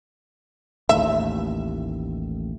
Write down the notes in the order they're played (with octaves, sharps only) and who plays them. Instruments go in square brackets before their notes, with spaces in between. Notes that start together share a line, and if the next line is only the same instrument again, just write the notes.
[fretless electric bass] A1 D#2 A2 [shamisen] E5